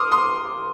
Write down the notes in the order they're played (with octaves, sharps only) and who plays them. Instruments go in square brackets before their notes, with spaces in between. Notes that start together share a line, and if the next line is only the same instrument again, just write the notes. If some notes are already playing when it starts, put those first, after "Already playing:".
Already playing: [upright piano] C6 D6 D#6 F6
C6 D#6